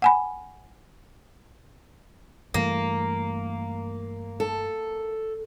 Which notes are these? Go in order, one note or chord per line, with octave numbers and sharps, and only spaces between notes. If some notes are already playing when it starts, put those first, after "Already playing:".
F#5 G#5 B5
G2 E3 A3 A#3
A4